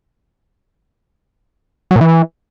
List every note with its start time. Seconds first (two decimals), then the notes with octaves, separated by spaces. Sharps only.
1.91 F#3
1.96 A#2
2.01 E3